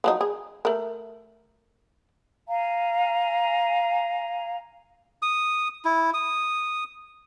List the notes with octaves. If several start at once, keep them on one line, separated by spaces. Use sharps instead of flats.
F3 F#3 D#4
G#4
A3 A#4
F5 G#5 A#5
D#6
E4
D#6